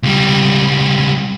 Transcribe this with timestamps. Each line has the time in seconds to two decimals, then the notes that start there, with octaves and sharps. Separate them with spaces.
0.03 C#2 G3